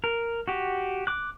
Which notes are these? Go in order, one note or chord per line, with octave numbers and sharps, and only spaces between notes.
A#4
F#4 G4
D6 F#6